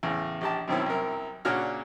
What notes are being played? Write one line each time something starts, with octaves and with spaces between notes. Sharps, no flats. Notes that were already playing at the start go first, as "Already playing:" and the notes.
E2 A2 C#3
A#1 G4 A5
F#2 B2 D#3 C4 C#4 E4
C2 F#2 A#4
A#2 C#3 D4 F#4 C#5 F6